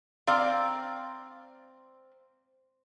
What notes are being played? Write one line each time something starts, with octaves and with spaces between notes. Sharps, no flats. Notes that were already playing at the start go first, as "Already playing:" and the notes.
C4 D5 F5 A#5 C6 E6